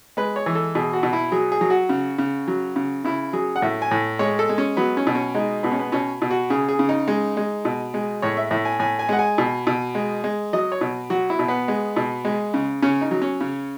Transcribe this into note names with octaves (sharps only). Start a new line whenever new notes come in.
G#3 B4
C#5
E3
A4
B2 G#4
F#4
B2
E4
F#3 G#4
G#4
F#3
F#4
C#3
C#3
F#3
C#3
C#3 E4
F#3 G#4
F#5
A2 E5
G#5
A2
G#3 C#5
A4
G#3
C#4
F#3 B3
C#4
B2
C#4
G#3 D#4
B2 B3
C#4
B3
B2 C#4
B2
F#4
C#3 G#4
G#4
C#3
D#4
G#3
G#3
B2
G#3
A2 C#5
E5
A2 E5
G#5
A2 G#5
G#5
G#3 F#5
G#5
B2
B2
G#3
G#3
F#3 D#5
C#5
B2
F#3 F#4
E4
B2
B3
G#3
B2
G#3
C#3
C#3 C#4
D#4
F#3
C#4
C#3